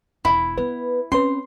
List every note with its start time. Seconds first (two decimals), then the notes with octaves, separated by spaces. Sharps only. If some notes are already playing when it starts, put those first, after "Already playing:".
0.25 E1 E4
0.58 B3 B4
1.12 C4 C#4 B4 C6